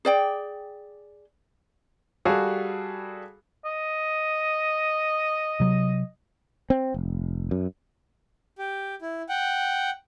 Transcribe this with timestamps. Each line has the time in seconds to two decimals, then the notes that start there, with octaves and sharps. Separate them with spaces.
0.05 G#4 D5 G5
2.25 G3 F#4 G#4 A4 F5
3.65 D#5
5.60 C3 F#3
6.70 C4
6.94 F1
7.51 F#2
8.58 G4
9.02 E4
9.29 F#5 G5